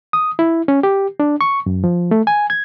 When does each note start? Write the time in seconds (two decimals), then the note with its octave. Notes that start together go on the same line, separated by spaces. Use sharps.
0.13 D#6
0.39 E4
0.68 C#4
0.83 G4
1.20 D4
1.41 C#6
1.66 F#2
1.84 F3
2.11 A3
2.27 G#5
2.50 G#6